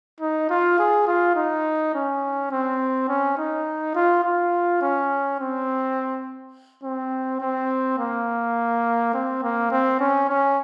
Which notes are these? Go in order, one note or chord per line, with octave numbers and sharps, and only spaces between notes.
D#4
F4
G#4
F4
D#4
C#4
C4
C#4
D#4
F4
F4
C#4
C4
C4
C4
A#3
C4
A#3
C4
C#4
C#4